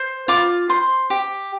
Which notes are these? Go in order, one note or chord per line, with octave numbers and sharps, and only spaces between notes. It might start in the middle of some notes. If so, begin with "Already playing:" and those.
Already playing: C5
F4 D6
C5 C6
G4